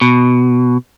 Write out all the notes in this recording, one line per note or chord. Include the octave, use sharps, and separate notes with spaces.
B2